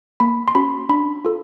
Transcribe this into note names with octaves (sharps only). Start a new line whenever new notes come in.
A#3 B5
C6
C#4 F#4 B5
D4 B5
F4 A4